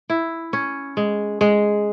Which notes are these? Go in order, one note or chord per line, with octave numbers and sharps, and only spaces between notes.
E4
C#4
G#3
G#3